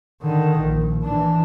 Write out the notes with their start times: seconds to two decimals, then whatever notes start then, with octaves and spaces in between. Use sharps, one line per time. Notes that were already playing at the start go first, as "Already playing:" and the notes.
0.22 D3 D#3
0.60 A#1
1.04 E3 D4